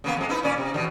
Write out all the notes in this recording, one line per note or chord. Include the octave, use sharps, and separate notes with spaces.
C#3 A#3 B3
F2 G#3
D#4 E4 B4
A#2 C#4 D5
C3
E2 B2 D3